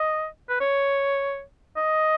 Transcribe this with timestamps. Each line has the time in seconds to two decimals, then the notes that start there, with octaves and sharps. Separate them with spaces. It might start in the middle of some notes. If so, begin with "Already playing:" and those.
Already playing: D#5
0.49 B4
0.61 C#5
1.77 D#5